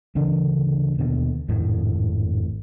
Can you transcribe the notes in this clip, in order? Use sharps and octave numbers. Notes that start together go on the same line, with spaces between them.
D2 C#3 E3 D4
D#2 B2 D3
G#1 F2 A2